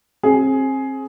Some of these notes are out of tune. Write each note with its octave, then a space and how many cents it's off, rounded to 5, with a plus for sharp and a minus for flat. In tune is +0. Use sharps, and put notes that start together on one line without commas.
C4 +35 G#4 +15